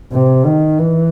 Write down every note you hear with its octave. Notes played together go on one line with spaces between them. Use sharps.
C3
D#3
E3